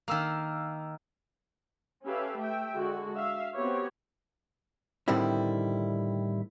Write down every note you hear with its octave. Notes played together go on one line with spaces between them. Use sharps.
D#3 A#3 F5 E6 F6
C#4 G4 A4 B4 E5 F5
A3 E5 G5
D3 G#3 F#4
E5 F5
B3 C4 F#4 G4 C#5
A2 D3 D#3 G3 C4 E4